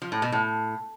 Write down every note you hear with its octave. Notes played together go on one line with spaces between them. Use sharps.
F3
A2
B2
A2